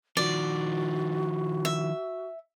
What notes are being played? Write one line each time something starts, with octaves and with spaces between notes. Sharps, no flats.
D#3 F3 F#4 D5
E5